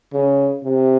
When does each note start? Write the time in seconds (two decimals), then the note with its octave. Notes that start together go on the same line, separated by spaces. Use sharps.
0.13 C#3
0.64 C3